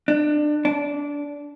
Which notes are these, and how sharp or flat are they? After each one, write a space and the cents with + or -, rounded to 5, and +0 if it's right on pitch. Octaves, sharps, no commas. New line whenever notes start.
D4 +25
D4 -20